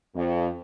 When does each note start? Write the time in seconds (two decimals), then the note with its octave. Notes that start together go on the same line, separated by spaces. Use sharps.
0.14 F2